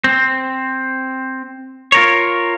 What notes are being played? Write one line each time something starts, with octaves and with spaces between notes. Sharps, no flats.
C4
F4 A#4 C#5